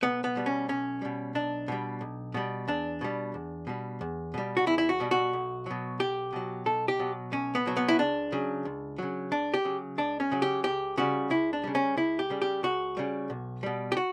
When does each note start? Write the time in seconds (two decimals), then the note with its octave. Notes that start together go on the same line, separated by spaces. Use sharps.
0.02 B1 B3
0.24 B3
0.36 B2 G3
0.46 C#4
0.69 B1 C#4
1.02 B2 G3
1.35 B1 D4
1.68 B2 G3
2.01 B1
2.34 B2 G3
2.68 E2 D4
3.01 B2 G3
3.34 E2
3.67 B2 G3
4.01 E2
4.34 B2 G3
4.57 F#4
4.66 E2 E4
4.78 E4
4.89 F#4
5.00 B2 G3
5.11 F#4
5.33 B1
5.66 B2 F#3
6.00 B1 G4
6.33 B2 F#3
6.66 B1 A4
6.88 G4
6.99 B2 F#3
7.32 B1 C#4
7.55 B3
7.66 B2 F#3
7.77 B3
7.88 E4
7.99 C#2 D4
8.32 C#3 F#3
8.65 C#2
8.98 C#3 F#3
9.31 C#2 D4
9.54 G4
9.65 C#3 F#3
9.98 C#2 D4
10.20 C#4
10.32 C#3 F#3
10.42 G4
10.64 C#2 G4
10.97 C#3 G3 F#4
11.30 C#2 E4
11.53 D4
11.64 C#3 G3
11.75 C#4
11.97 C#2 E4
12.19 G4
12.30 C#3 G3
12.42 G4
12.63 C#2 F#4
12.97 C#3 G3
13.30 B1
13.63 B2 G3
13.92 G4
13.97 F#4